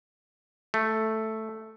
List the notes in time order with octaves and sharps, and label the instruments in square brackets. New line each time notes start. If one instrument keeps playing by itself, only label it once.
[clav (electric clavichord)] A3